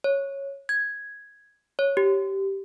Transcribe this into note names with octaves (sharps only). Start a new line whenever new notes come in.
C#5
G#6
C#5
G4